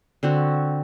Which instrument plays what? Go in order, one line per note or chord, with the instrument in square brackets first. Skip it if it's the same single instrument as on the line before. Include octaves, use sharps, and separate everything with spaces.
[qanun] D3 C4 F#4